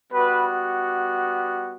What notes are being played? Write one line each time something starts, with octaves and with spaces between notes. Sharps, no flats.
G3 B3 F#4 B4